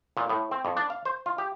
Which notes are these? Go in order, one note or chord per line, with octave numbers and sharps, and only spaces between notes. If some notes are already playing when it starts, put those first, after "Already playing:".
A#2
A2
C4
F2
D4
F5
C5
F4
G4